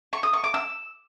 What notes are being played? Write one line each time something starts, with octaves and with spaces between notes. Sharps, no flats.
C#6
D#6
C#6
D6
E6